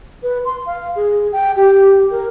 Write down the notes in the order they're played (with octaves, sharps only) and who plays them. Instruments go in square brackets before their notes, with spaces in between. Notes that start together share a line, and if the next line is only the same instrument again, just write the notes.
[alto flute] B4
C6
F5
G#4
G5
G4
A#4